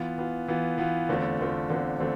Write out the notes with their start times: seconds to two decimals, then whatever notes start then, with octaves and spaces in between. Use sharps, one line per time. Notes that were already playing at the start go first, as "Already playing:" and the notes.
Already playing: E3 B3 F4
0.18 E3 B3 F4
0.48 E3 B3 F4
0.78 E3 B3 F4
1.09 E2 D3 A3 C4 F4
1.39 E2 D3 A3 C4 F4
1.69 E2 D3 A3 C4 F4
2.00 D3 A3 C4